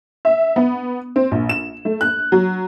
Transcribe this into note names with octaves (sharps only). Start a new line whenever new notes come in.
E5
B3
C4
A#1
E7
A3
F#6
F#3